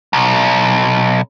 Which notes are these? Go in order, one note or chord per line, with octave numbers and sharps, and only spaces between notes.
B1